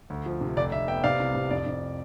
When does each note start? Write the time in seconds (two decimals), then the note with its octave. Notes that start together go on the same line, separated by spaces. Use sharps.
0.10 D2
0.26 F3
0.41 C3
0.57 F1 D5
0.72 F1 E5
0.88 B3 E5 G5
1.03 C3 D5 F5
1.20 C2
1.35 C3
1.51 F2 D5
1.66 F2